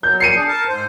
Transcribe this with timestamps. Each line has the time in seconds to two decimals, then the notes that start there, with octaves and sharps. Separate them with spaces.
0.03 F#3 G6
0.20 C7 C#7 D#7
0.36 D4 G#4
0.48 A#4 A5
0.68 G#2 C5